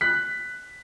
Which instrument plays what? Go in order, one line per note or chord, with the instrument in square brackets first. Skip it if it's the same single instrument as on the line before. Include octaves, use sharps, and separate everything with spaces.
[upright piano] F#6 B6